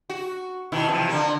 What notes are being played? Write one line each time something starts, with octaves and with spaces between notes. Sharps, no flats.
F#4
B2 D#3 E4
C3 E3 F3
D3 A#3